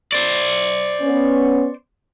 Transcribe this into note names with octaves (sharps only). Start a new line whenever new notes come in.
C5 D5
B3 C#4